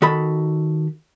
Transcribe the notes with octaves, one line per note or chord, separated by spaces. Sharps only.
D#3 F#4 A4 B5